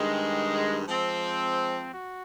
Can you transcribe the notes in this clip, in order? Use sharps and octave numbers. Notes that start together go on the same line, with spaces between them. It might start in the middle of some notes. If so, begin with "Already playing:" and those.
Already playing: G2 D#3 G#3
F3 G#3 C4
F#4